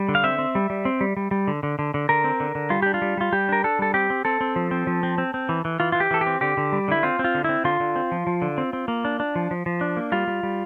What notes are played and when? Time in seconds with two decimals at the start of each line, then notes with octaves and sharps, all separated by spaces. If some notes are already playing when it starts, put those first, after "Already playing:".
Already playing: G3
0.09 D3
0.15 F5
0.24 C4 E5
0.39 C4
0.55 G3
0.70 G3
0.85 C4
1.01 G3
1.17 G3
1.31 G3
1.47 D3
1.63 D3
1.79 D3
1.94 D3
2.09 D3 A#4
2.24 C4
2.40 D3
2.55 D3
2.70 G3 F4
2.82 D4 G4
2.94 F4
3.02 G3
3.17 G3 F4
3.32 G3 G4
3.49 D4 A#4
3.64 D4 A4
3.79 G3 A4
3.94 C4 G4
4.10 C4
4.25 C4 A4
4.41 C4
4.56 F3
4.71 C4
4.87 F3
5.03 C4
5.18 C4
5.34 C4
5.49 E3
5.65 E3
5.80 E3 F4
5.92 E3 F4
6.00 G4
6.11 E3 A4
6.21 G4
6.27 C4
6.41 D3 G4
6.57 D3
6.72 G3
6.88 D3 E4
7.03 C4 F4
7.19 C4
7.24 F4
7.35 D3
7.44 C4 E4
7.64 D3 F4
7.80 D3
7.96 C4
8.12 F3
8.27 F3
8.42 D3
8.58 C4
8.73 C4
8.88 A#3
9.05 D4
9.20 D4
9.36 F3
9.51 F3
9.66 F3
9.81 D4
9.97 A#3
10.12 G3 F4
10.27 G3
10.43 G3